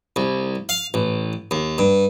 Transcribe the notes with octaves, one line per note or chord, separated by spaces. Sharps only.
C2
F5
A1
D#2
G2